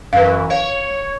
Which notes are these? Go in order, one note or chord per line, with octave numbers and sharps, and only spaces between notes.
F#2 E3 B4 F5
C#5 F5